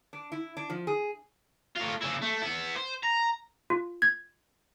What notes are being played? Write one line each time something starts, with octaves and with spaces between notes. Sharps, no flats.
D4
E4
D4
F3
G#4
A2 F4
C#3 E4
A3
B3 E4
C5
A#5
F4
G#6